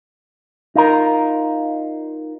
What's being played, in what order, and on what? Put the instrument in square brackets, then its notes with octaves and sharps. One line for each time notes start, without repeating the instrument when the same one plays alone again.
[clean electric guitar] D#4 F4 A#4